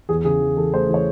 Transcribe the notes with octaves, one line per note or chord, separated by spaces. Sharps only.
E2 G#4
C#3 G#4
E3
E3 A4
A3 C5
E3
C#5